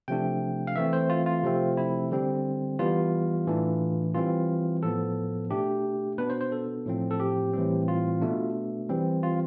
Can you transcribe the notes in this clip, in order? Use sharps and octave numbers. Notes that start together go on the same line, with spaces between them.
C3 F3 A3 D4 G5
F5
E3 A3 C4 E5
C5
F4
F4
C3 F3 A3 C4
E4
D3 G3 C4
E3 G3 B3 F4
A2 E3 A3 D4
E3 G3 C4 F4
A2 F3 B3 A4
B2 A3 D4 G4
B2 B3 D4 B4
C5
C5
A4
A2 F3 C4
A4
G4
A2 E3 G3 C4
F4
B2 A3 D4
E3 G3 C4
F4